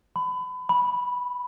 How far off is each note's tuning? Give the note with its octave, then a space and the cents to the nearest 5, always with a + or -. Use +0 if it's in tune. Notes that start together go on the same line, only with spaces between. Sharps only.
B5 +30
B5 -5